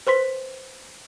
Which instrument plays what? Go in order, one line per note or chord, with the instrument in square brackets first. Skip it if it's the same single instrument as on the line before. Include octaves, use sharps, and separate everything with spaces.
[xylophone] B4 C5 C6 B6